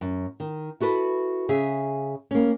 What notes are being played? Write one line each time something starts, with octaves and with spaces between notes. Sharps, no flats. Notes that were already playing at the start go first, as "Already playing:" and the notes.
F#2
D#3
E4 F#4 A4 B4
C#3 G#4 E5
A#3 C#4